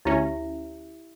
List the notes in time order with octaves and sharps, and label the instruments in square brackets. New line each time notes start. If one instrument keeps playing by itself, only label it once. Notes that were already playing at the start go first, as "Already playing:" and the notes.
[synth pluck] D2 C#4 [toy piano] E4 G4 E5